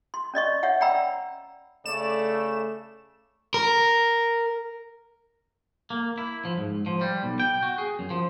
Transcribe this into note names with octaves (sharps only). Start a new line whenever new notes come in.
C6
C#4 D5 D#5 C#6
C#5 E5 F#5
D5 F#5 G5 A#5 B5 E6
C#3 A3 D5 E7
A#4
A#3
E4
F3
G#2
F3
G3
B1
G5
F#4
G#4
F#2
F3